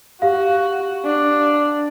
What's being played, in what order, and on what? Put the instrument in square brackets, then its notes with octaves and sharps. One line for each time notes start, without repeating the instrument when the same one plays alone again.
[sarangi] F#4 [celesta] G4 F5
[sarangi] D4